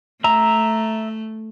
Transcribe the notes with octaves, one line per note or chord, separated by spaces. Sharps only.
A3 E5 A#5